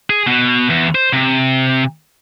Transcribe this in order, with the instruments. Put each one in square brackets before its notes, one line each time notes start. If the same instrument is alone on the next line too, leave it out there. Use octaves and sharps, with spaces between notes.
[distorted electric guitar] G#4
B2
E2
C5
C3